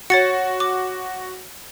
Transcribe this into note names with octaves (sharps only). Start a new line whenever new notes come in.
F#4 C#5 A6 C#7
D6